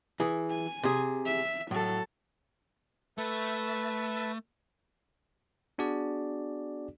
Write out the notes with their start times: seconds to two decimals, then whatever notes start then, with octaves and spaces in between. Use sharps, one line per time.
0.20 E3 G#4
0.51 G#5
0.83 C3 G#4
1.26 E5
1.71 A2 F#3 A4
3.18 A3 B4 E5 A5
5.78 B3 D4 F#4 G#4 D5